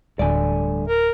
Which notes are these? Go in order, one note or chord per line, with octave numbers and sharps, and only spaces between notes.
D1 G2 D3 A3 D5 G#5
A#4